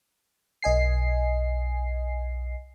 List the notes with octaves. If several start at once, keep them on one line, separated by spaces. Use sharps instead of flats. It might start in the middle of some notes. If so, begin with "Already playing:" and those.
B1 D#5 G#5 C7